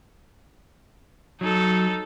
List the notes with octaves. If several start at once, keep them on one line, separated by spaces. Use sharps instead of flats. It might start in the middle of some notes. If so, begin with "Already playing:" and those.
F#3 D#4 A4